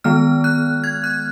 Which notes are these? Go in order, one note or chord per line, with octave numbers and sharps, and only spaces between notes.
D#3 G#3 B3 F6
F#6
G#6
F#6